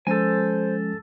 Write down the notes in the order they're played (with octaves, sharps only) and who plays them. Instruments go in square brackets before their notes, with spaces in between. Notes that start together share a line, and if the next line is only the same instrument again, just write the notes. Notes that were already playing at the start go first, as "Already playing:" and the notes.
[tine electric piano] F3 G#3 C#4 [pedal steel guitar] A4 G#5 [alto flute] C5